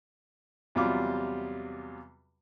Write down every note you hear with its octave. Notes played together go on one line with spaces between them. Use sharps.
E2 C3 F#3 G3 F4 D6